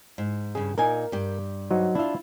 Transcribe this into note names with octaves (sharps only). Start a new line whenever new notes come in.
G#2
G2 C#3 G#4
A#2 D#4 A#4 G#5
G2 G4
F#3 D#4 C5
D4 E4 F4 E5